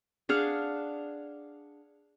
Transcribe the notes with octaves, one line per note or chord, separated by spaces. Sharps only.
D4 G#4 F5 F#5